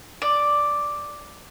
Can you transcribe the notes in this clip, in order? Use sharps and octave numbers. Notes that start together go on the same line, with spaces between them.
D5